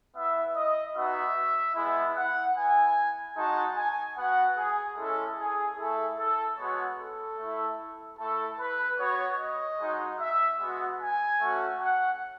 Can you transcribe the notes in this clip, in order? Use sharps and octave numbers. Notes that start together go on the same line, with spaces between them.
B3 E4 E5
D#5
B3 D#4 F#4 E5
G#3 B3 E4
F#5
B3 E4 G#5
G#3 D#4 F#4 A5
G#5
B3 F#4 F#5
G#4
G#3 C#4 E4 A4
G#4
A3 E4 A4
A4
G#3 B3 F#4 C#5
A4
A3 E4
A3 E4 A4
B4
B3 F#4 C#5
D#5
G#3 D#4 F#4
E5
G#3 B3 F#4
G#5
A3 C#4 F#4
F#5